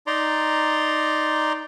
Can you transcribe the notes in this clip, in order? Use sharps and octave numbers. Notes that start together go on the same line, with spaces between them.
D#4 D5 A#5 C6